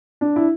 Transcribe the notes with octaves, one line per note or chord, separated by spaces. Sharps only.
D4
E4